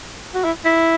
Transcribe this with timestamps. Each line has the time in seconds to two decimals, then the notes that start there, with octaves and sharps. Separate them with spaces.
0.34 F#4
0.44 E4
0.65 E4